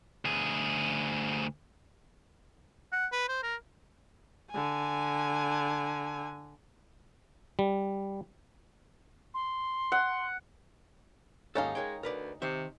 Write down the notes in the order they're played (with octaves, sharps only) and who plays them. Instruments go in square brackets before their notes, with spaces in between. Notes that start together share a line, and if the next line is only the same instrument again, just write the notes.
[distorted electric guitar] D2 G#4
[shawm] F#5
B4
C5
A#4
[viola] D3 G#5
[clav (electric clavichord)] G3
[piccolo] C6
[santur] F#5
[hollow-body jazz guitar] D#2 G#2 A4 [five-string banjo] C#4 D#4 F5
[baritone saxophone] G#3 [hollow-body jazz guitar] A#4 C#5 G5
[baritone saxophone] D2 [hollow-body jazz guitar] A#4 B4 D5
[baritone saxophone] C3 [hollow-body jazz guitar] D#3 C5 E5